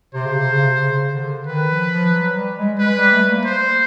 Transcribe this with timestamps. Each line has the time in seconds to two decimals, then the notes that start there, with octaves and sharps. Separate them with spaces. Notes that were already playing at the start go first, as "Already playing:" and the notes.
0.14 C3 C5
0.26 C#3
0.36 C3
0.48 C#3
0.59 C3
0.80 C#3
1.14 D3
1.47 D#3 B4
1.69 F3
1.90 F3
2.14 F#3
2.35 G3
2.56 G#3
2.79 G#3 B4
2.96 G3
3.12 A3
3.29 A#3
3.45 C5